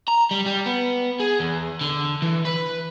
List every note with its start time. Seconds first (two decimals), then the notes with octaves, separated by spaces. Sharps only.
0.08 A#5
0.31 G3
0.46 G3
0.66 B3
1.20 G#4
1.40 E2
1.81 D3
2.22 E3
2.45 B4